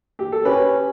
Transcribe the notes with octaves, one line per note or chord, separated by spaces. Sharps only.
G4
A4
C#4 G4 B4